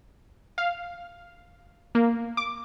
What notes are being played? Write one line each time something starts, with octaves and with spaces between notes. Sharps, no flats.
F5
A#3
D6